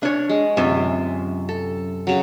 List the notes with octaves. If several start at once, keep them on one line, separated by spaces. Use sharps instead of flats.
D4 C#5
G#3
F#2 C3 F4 E5
A4
C#3 F#3